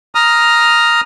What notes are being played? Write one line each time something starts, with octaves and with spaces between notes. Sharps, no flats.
A#5 D#6 F6